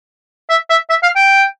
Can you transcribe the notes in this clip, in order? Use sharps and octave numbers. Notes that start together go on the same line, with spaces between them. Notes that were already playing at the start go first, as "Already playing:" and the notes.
E5
E5
E5
F5
G5